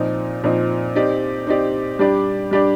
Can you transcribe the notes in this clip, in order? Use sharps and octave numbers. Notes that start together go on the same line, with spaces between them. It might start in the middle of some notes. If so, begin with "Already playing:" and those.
Already playing: A#2 F3 C4 D#4
A#2 F3 C4 D#4
C4 D#4 G4 D5
C4 D#4 G4 D5
G3 D4 G4 D5
G3 D4 G4 D5